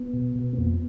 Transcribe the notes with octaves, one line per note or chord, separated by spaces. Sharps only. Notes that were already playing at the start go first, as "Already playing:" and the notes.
Already playing: B3
B2
B2
B3
F2 A#3
B3